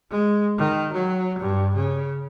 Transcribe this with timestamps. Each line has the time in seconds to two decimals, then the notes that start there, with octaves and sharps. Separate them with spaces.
0.11 G#3
0.58 D#3
0.93 F#3
1.39 G2
1.76 C#3